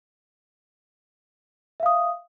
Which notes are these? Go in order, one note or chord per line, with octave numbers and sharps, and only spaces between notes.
E5 F5 D#6